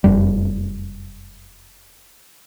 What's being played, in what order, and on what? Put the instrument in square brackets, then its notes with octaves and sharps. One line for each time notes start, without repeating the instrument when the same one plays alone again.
[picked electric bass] F1 F#2 G3